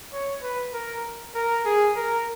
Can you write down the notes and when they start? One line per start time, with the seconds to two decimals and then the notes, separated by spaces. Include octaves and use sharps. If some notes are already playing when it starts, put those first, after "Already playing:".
0.12 C#5
0.42 B4
0.74 A#4
1.35 A#4
1.65 G#4
1.96 A#4